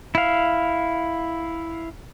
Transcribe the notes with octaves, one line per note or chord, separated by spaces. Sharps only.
E4 F5